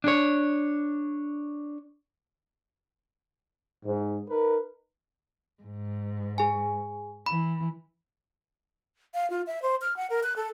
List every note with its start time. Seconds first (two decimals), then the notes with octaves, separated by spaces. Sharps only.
0.04 D4 C#5
3.86 G#2
4.29 D#4 A#4 B4
5.62 G#2
6.38 G#4 G#5
7.26 E3 B5
9.14 F5
9.30 F4
9.47 E5
9.62 C5
9.82 F6
9.97 F#5
10.10 A#4
10.24 F#6
10.36 A4